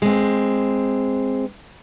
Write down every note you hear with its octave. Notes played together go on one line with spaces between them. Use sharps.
G#3 C4